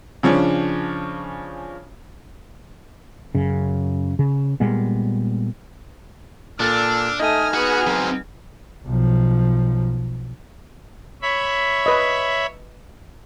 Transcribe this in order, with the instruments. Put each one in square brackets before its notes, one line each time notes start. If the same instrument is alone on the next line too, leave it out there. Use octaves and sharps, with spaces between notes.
[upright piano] C#3 F3 C#4 D4
[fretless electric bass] F#2 C#3
C#3
A#2 G3 G#3 B3
[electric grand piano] A#2 A4 A6 [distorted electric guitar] D4 [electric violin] E6 F6
[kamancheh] A3 D#6 [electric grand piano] D#4 D#5 [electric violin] G#5 F6
[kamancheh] B3 G#4 [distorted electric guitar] F#4 F#5
[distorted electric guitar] F#3 C4
[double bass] B1 F3
[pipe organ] C#5 E5 B5
[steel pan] B4 D#5